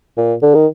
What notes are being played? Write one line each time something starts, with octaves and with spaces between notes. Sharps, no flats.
A#2
D3
D#3